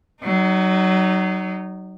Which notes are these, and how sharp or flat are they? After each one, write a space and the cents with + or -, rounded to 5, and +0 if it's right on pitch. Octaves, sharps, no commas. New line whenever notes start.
F#3 +25 D#4 -20